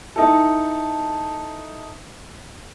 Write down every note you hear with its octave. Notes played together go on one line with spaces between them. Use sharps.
D#4 E4 A4